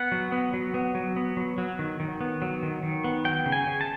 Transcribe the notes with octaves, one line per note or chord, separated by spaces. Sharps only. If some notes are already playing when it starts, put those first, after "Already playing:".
Already playing: B3 F#5
F#3
B3
F#3
B3
F#3
B3
F#3
F#3
D#3
D#3
B3
F#3
D#3
D#3
B3
F#3 G5
C#3
G#5
C#3
A5